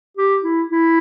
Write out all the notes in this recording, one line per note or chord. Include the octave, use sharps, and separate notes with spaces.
G4
E4
E4